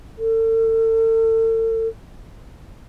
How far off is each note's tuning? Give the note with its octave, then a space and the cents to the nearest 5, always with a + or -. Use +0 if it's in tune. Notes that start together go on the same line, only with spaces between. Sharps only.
A4 +40